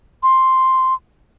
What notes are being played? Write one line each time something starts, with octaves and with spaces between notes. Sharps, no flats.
C6